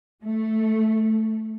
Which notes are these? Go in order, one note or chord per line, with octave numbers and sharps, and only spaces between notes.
A3